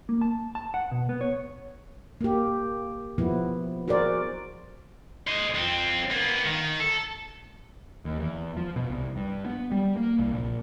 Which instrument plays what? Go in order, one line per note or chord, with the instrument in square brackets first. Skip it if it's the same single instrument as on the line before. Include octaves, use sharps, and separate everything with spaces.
[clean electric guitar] A#3
A5
A5
F#5
B2
B3
C#5
[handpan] A#3 G4
F3 B3 E4
F#4 G#4 A#4 C5 D5
[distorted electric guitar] C5 D#5
F2 C4
A#3 B3
D#3
A4
[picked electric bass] D#2
E2
F3
B2
C2
G2
B3
G3
A#3
C2
A#1